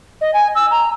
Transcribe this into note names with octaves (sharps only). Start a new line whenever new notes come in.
D#5
G#5
E6
A#5